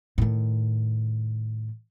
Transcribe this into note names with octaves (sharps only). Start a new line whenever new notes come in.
A2 D#3